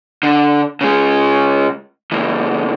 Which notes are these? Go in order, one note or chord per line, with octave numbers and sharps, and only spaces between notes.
D3
C#3 G#3
C#2 E3